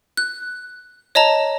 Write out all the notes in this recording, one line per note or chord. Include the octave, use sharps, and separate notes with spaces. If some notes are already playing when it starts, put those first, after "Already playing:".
F#6
C#5 D#5 A5 A#5